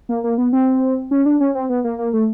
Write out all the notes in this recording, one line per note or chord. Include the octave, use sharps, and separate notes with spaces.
A#3
A#3
B3
C4
C#4
D4
C#4
C4
B3
A#3
A#3
A3